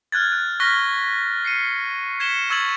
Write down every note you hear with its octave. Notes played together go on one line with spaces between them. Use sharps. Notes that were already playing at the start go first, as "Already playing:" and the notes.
F6 F#6 G#6 A6
F#6
C#6 F6 F#6 A#6 B6 G7
C7 C#7 D#7
G#6 B6 C#7 E7 G7
C#6 E6 G#6 A6 F#7